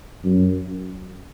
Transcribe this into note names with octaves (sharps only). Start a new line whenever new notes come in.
F#2